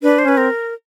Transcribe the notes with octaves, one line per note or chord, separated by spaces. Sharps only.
D4 B4
C5
C#4 B4
C4 A#4